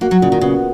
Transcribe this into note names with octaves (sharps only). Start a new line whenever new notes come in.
A#3 F#4
F#3
A#2 C#3
D#3
C#3 B3